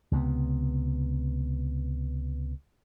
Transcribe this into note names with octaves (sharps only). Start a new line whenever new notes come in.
C#2 C3 G3 B3